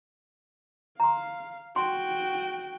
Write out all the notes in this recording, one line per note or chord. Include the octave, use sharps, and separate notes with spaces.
F5 A#5 C6
F#4 G5 C6